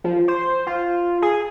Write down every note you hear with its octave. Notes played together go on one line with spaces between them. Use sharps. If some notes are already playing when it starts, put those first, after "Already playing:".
F3
C5
F4
G#4